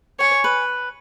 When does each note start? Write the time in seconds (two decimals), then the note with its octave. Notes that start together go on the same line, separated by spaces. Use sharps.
0.20 C#5 G#5
0.44 B4